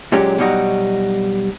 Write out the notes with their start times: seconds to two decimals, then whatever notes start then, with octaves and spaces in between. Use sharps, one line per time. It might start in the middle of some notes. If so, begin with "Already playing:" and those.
0.12 A#2 F#3 G#3 C#4 G4
0.38 B2 F#3 G3 D#4 F#4